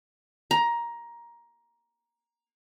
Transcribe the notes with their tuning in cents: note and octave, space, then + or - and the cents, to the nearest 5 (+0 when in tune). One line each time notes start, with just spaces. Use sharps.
A#5 +15